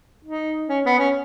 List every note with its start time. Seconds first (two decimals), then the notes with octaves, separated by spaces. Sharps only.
0.25 D#4
0.69 C#4
0.85 B3
0.99 C#4